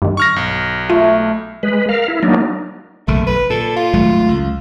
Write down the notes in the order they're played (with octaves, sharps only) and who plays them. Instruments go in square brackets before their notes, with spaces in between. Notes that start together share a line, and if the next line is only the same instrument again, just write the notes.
[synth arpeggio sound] G2 D#3
[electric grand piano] C#6 F6 A#6
B1
[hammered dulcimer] A3 [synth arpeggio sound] F4
[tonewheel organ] G#3 B4
A#4 F5
E4
F#3 A#3 D4 D#4
[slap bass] F#1 B1 D#3 [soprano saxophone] A3
[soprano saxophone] B4
[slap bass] A#2 [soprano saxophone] A4
[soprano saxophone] F4
[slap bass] G#1 F#3 A3
C#2